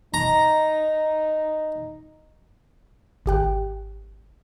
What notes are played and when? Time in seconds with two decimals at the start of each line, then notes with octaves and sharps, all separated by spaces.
0.14 D#4 A#5
3.26 G#1 G4 G5 F#6